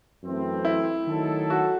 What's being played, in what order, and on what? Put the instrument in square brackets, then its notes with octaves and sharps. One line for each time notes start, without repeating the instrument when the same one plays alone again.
[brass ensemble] F#2 E3 A3 C4
[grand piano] E4
[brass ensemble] D#3 F#3 A3 D#4 A4
[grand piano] F#4